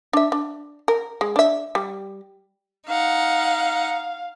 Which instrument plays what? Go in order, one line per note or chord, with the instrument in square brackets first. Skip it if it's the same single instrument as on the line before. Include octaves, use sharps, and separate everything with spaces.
[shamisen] D4 E5
D4
A#4
G#3
D4 E5
G3
[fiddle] D#4 F#5 [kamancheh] F5